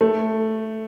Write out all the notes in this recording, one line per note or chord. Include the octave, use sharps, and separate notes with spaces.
A3